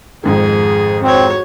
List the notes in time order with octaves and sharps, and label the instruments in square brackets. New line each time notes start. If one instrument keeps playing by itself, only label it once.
[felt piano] F2 G#2 D#3 [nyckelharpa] G#4
[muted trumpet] C4 [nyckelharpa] F#4 C#5